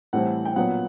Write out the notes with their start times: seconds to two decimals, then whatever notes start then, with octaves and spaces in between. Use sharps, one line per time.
0.13 A2 E3 G3 C4 F#5
0.45 G5
0.56 A#2 F#3 B3 F#5